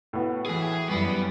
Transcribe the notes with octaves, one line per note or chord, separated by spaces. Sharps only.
A2 B3 F#4
E3 G#4 G#5
F#2 E3 G3 B3